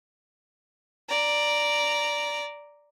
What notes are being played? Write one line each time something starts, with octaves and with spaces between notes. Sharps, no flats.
D5 A#5